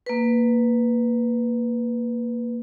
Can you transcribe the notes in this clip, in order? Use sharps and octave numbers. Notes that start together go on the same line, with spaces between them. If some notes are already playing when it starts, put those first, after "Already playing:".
A#3 B4